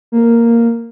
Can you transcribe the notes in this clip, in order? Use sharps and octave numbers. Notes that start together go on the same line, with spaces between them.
A#3